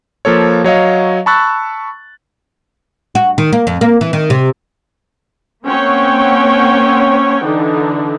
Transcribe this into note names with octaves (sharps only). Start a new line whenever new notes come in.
F3 A#3 A4 C#5
F#3 C#5 D#5 F5
A5 B5 C#6 E6 F#6 A6
F#4
D#3
A#3
F2
A#3
E3
D#3
C3
A#3 C4 C#4 C#5 F#5 G5
D3 E3 D4 D#4